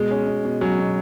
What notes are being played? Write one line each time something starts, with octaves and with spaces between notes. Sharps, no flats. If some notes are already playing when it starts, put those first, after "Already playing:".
Already playing: B2 G#3
C#4
B2
B2
F#3 C#4
B2